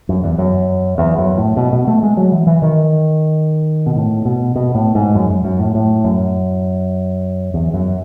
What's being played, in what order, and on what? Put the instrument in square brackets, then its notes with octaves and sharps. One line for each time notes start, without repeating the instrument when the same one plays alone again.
[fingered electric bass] F#2
E2
F#2
E2
F#2
A2
B2
B2
A3
G#3
F#3
E3
E3
D#3
B2
A2
B2
B2
A2
G#2
F#2
F#2
F#2
A2
A2
F#2
E2
F#2